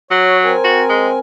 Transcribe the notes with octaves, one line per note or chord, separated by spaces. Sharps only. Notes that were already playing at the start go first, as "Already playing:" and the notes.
F#3 C#5
C4 A#4 G#5
F#4
G#3